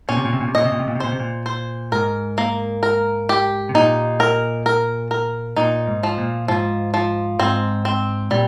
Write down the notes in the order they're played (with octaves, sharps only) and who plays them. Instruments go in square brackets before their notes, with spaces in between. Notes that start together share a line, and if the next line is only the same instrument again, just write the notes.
[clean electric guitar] A#2 [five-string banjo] C#4
[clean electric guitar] C3
A#2
C3
A#2
C3
[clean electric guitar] A#2 [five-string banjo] D#5
[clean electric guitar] C3
A#2
C3
A#2
C3
[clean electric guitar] A#2 [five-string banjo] C5
[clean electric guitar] C3
A#2
[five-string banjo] C5
[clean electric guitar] G#2 [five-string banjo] A#4
[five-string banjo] A#3
A#4
G4
[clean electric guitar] C3
[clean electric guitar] A#2 [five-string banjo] D#4
[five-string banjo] A#4
A#4
A#4
[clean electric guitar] A#2 [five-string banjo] D#4
[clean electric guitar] G#2
[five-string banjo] F3
[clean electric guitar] A#2
[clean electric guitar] G#2 [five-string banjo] F3
[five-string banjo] F3
[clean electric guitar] G#2 [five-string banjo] C4
[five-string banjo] C4
[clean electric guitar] A#2 [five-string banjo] G3